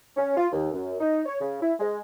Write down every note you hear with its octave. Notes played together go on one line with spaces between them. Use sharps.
C#4
F4
D#2
F#2
D#4
C#5
C#3
E4
G#3